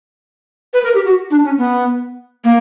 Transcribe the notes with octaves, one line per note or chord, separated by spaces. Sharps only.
B4
A#4
G4
F#4
D4
C#4
B3
A#3